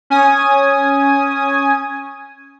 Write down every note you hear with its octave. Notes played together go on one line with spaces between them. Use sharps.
C#4 G#5 D#6